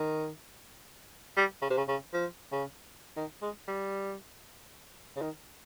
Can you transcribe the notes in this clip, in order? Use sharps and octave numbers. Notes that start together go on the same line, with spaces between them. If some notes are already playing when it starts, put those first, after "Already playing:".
Already playing: D#3
G3
C#3
C3
C#3
C#3
F3
C#3
D#3
G#3
G3
C#3
D#3